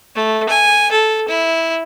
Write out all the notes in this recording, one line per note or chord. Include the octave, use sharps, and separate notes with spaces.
A3
G#5
A4
E4